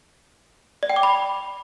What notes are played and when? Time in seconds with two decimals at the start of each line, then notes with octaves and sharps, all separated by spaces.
0.83 D5
0.90 G5
0.96 D6
1.03 B5